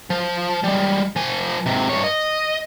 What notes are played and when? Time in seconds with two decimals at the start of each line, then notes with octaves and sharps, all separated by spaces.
0.10 F3
0.64 G3 G#3
1.16 F3 G#5
1.66 G#2 C3
1.89 G2 C#5
2.04 D#5